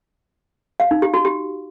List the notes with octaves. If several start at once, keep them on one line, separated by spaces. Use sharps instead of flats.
F5
D#4
G4
F#4
G4